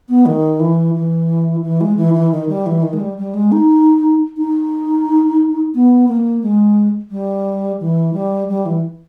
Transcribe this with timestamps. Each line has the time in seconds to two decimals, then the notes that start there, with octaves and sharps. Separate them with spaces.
0.09 B3
0.26 D#3
0.60 E3
0.94 E3
1.63 E3
1.81 G#3
1.97 E3
2.14 E3
2.31 D#3
2.49 G3
2.66 E3
2.82 D#3
2.93 G#3
3.00 G3
3.18 G3
3.34 G#3
3.52 D#4
4.37 D#4
5.75 B3
6.08 A#3
6.43 G#3
7.11 G3
7.80 E3
8.13 G3
8.49 G3
8.66 E3